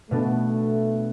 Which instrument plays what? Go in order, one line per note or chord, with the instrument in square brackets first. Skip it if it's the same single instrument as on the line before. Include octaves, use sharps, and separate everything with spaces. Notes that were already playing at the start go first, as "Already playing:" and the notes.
[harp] B2 B3 D4 [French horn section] A3